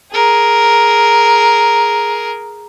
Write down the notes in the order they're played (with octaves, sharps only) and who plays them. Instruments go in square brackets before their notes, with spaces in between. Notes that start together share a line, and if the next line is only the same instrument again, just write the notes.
[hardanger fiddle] G#4 A#4